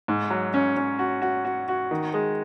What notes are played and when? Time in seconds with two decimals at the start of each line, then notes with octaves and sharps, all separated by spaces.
0.08 G#2
0.30 F#3
0.54 C#4
0.77 C#4
0.99 F#4
1.22 F#4
1.45 F#4
1.68 F#4
1.91 D#3
2.14 G#3